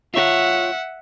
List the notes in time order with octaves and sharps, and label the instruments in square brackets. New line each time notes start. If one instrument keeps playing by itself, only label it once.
[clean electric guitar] F4 C#5 [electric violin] E5 F#5